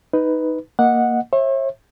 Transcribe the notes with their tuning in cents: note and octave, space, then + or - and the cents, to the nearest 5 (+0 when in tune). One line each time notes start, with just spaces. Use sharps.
D#4 +10 B4 +5
A#3 +0 D#5 +0 F#5 -10
C#5 -45 E5 -5